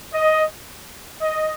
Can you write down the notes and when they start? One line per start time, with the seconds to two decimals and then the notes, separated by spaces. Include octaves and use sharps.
0.12 D#5
1.21 D#5